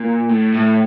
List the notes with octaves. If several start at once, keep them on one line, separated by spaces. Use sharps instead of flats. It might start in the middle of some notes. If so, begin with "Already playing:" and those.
Already playing: A#2
A2
A2